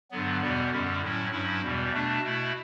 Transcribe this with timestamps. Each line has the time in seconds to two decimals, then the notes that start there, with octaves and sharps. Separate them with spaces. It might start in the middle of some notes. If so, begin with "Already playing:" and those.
0.11 G2 D3 F#3 B3
0.41 E2 B2 G3 B3
0.71 F#2 D3 G3 C#4
1.01 A2 F#3 C#4 E4
1.31 G2 F#3 C#4 E4
1.62 E2 B2 G3
1.92 B2 A3 D4
2.23 B2 A3 E4